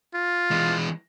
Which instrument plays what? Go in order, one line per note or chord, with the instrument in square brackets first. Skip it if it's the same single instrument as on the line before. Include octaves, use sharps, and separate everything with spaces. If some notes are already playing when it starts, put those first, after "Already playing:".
[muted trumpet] F4
[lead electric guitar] E3 G#3